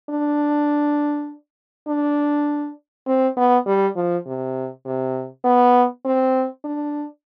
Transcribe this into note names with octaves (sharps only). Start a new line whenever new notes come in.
D4
D4
C4
B3
G3
F3
C3
C3
B3
C4
D4